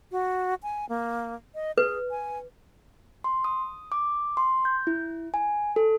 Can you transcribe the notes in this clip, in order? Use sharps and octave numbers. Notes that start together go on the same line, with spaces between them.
F#4
G#5
A#3
D#5
G#4 B4
G#5
C6
D#6
D6
C6
G6
E4
G#5
A4